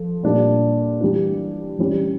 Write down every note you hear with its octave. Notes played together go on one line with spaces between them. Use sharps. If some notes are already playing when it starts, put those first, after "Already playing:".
Already playing: F3 A4
A#2 G3 D4
E3 G3 D4
E3 G3 C#4